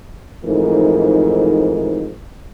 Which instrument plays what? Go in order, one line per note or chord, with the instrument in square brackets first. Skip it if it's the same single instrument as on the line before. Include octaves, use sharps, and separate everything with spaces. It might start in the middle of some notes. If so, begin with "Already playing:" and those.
[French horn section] F2 G#2 E3 A3 D#4 A#4